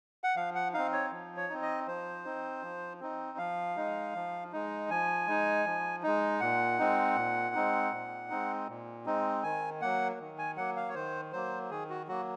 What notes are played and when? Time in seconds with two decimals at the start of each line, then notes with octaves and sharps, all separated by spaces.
0.24 F#5
0.36 F3 F5
0.55 F#5
0.73 C4 D#4 F5
0.93 C#5
1.11 F3
1.37 C#5
1.49 C4 D#4
1.62 D#5
1.87 F3 C5
2.25 C4 D#4
2.63 F3
3.00 C4 D#4
3.38 F3 F5
3.76 G#3 D#4
4.15 F3
4.53 G#3 D#4
4.89 F3 G#5
5.27 G#3 D#4
5.65 F3
6.03 G#3 D#4
6.40 A#2 F#5
6.79 G#3 C4 D#4
7.16 A#2
7.55 G#3 C4 D#4
7.92 A#2
8.30 G#3 C4 D#4
8.68 A#2
9.06 G#3 C4 D#4
9.43 D#3 G#5
9.81 F#3 A#3 F#5
10.19 D#3
10.38 G#5
10.57 F#3 A#3 F#5
10.76 F5
10.89 C#5
10.94 D#3 C5
11.32 F#3 A#3 C5
11.70 D#3 G#4
11.89 F#4
12.08 F#3 A#3 F#4